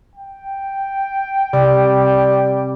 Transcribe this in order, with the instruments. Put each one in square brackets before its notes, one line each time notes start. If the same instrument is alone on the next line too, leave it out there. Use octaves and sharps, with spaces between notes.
[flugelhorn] G5
[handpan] C3 [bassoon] G3